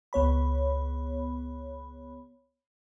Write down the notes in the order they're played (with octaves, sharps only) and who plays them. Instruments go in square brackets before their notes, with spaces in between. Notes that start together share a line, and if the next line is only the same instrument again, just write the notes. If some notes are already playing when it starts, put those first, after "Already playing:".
[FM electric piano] C#2 B3 C#5 B5